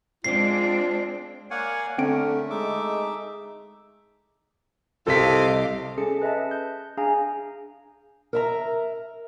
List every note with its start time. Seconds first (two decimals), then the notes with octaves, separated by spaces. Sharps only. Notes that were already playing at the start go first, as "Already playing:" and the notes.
0.24 G#3 C4 D4 F4 C7
1.51 A#3 C#5 D5 F5 F#5 G#5
1.98 D3 A3 C4 C#4 A#4 D7
2.50 G#3 D#4 E5 D6
5.07 C2 C3 A4 D#5 F5 D6 B6
5.98 C#4 G#4 A4 A5 C#7
6.22 B4 D#5 E5 A5
6.51 G6
6.97 D4 G#4 F5 G#5 A#5
8.33 A#4 E5 A#5